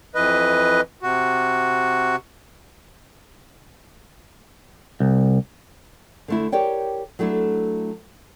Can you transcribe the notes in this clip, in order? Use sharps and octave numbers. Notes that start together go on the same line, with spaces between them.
F2 E3 B4 D#5
C3 F#4
C2
D3 A3 E4
G4 A#4 C#5 D5 G5
F#3 A3 D4 E4 A4